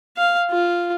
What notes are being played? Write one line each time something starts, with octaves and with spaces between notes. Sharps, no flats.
F5
F4